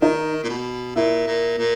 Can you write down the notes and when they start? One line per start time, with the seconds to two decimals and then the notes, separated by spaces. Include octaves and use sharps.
0.01 D#3 D#4
0.44 A#2
0.49 B2
0.96 A#2 E4
1.27 A#2
1.58 A#2